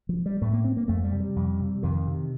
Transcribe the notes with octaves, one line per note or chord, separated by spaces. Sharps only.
F3
G3
A2 A3
A#3
C4
A#3
F2 A3
G3
C3
G3
F2
C3
F2 D#3
C3